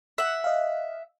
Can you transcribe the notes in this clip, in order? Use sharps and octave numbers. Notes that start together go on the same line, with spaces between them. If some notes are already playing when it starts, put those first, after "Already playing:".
E5 F#5
D#5 F5